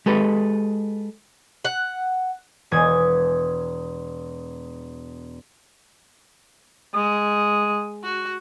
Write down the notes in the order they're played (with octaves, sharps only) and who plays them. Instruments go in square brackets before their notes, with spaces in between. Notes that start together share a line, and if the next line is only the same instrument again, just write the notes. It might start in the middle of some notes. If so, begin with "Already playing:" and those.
[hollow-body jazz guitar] G#3 G4 A4 B4
[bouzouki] F#5
[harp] E1 D#6 G#6
[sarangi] G#3 [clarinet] D#6
[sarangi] F#4